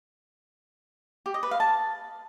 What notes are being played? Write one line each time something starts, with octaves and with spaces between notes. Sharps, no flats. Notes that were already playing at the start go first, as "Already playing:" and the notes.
G4
D#5
B4
F5
A5